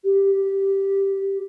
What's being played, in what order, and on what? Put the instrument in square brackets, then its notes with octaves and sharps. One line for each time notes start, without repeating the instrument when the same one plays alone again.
[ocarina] G4